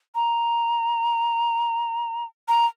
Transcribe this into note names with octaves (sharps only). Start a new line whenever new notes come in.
A#5
A#5